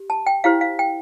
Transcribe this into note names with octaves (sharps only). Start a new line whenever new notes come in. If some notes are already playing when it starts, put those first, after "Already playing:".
Already playing: G4
A5
G5
E4 G4 C5 F5
F5
G5